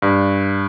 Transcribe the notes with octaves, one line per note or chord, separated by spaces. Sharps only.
G2